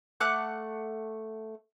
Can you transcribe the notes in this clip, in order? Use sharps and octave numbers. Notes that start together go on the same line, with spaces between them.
A3 F#5 D6 F#6